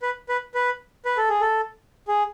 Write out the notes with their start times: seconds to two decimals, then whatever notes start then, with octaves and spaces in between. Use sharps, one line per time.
0.02 B4
0.29 B4
0.55 B4
1.05 B4
1.17 A4
1.29 G#4
1.41 A4
2.08 G#4